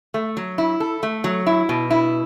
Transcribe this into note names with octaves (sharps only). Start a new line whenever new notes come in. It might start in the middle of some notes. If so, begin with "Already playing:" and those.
A3
F#3
E4
A4
A3
F#3
E4
B2
E4